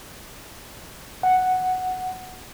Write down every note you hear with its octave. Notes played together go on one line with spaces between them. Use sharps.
F#5